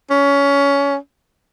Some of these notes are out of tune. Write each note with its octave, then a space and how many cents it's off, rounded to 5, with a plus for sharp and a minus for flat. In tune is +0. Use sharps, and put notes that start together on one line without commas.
C#4 +20